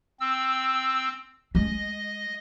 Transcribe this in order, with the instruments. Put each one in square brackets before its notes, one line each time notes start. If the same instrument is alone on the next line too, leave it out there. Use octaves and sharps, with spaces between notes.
[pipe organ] C4 E6
[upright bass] G#3 [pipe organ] D#5